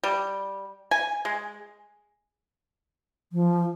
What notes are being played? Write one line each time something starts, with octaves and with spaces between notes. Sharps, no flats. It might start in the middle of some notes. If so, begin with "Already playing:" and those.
G3
G#5
G#3
F3